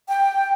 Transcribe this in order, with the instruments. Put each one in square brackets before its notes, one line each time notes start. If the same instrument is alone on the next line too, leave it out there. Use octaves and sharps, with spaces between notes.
[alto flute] G5